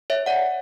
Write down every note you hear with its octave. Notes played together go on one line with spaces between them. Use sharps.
C#5 E5
D5 F#5